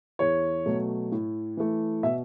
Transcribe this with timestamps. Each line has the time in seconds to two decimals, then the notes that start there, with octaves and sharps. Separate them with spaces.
0.19 E2 C#5
0.66 B2 F#3 A3
1.12 A2
1.57 E3 A3
2.03 B2 E5